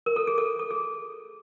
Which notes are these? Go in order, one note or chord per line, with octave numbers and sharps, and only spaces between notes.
A#4
A4
G#4
A4
A4
G#4